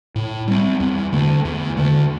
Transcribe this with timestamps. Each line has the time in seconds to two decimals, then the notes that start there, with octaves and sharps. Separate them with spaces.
0.16 A2
0.48 G3 C4
0.80 E2
1.12 D3 A3
1.45 E2
1.77 D3 A3